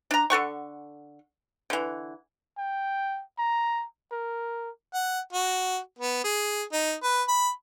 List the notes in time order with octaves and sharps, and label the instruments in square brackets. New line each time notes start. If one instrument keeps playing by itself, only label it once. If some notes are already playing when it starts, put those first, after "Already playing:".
[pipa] D4 A#5
D3 A4 F#5 C#6
D3 E3
[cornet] G5
A#5
A#4
[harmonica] F#5
F#4
B3
G#4
D#4
B4
B5